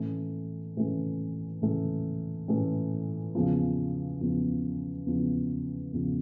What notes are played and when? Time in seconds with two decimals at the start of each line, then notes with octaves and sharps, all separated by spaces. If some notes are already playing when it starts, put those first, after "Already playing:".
Already playing: A2 E3 A3 C#4
0.76 A2 E3 A3 C#4
1.62 A2 E3 A3 C#4
2.48 A2 E3 A3 C#4
3.35 E2 C#3 F3
4.21 E2 C#3 F3
5.07 E2 C#3 F3
5.93 E2 C#3 F3